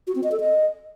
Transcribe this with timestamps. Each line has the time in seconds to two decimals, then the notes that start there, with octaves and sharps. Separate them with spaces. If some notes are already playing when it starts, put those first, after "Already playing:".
0.07 F#4
0.15 C4
0.24 D#5
0.32 A4
0.40 D#5